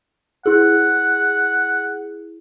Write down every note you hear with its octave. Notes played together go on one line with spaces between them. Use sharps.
E4 G#4 F#5